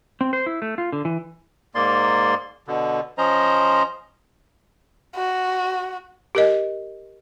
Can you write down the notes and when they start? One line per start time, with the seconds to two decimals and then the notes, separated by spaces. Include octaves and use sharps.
0.21 C4
0.33 C5
0.46 E4
0.62 A3
0.78 F4
0.93 D3
1.05 E3
1.75 G#2 A#3 D5 C6
2.68 B2 D3
3.18 F3 C#4 C5 D#5 A#5
5.16 F#4
6.35 G4 A#4 D#5